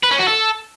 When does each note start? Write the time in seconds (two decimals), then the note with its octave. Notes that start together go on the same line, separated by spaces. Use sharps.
0.03 B4
0.11 C#4
0.19 F#4
0.27 A4